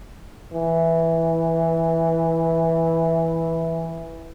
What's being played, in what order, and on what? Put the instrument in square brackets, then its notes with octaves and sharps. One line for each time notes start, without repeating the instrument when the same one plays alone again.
[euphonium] E3